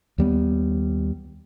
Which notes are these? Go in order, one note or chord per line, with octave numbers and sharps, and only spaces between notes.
D#2 G3 B3